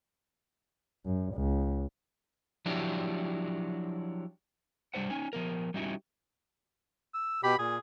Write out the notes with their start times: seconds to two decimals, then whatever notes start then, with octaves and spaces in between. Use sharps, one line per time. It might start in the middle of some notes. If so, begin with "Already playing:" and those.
1.06 F#2
1.34 C#2
2.66 F3 F#3 D4 E4 G4
4.94 G3 A#3 D4 C5 F#5
5.10 C#4 D#4 G#5
5.33 F3 B3 A#4
5.74 G3 C#4 D#4 E4 F#4 G4
7.14 E6
7.43 B2 G4 B5
7.59 A#2 G#4